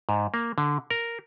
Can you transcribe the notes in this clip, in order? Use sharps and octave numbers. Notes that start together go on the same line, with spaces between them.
G#2
A#3
D3
A#4